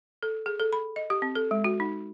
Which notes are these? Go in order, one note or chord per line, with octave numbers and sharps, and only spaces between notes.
A4
G#4
A4
B5
D#5
G4
C4
A4
G#3
F#4
D#4